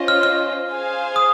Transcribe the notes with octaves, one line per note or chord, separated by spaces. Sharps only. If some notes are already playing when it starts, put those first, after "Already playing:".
Already playing: C#4 F4 C5 D#5
F6
F6
G#4 C5 F5 G#5
D#6